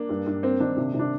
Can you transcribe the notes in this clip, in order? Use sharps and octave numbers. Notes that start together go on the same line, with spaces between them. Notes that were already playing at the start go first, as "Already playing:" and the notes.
Already playing: A#3 D4
G2
G2
A#3 C4
D#3 D4
C3
C3
D4